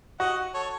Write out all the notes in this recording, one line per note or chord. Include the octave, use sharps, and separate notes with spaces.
F#4 D#5 F#5
A4 C#5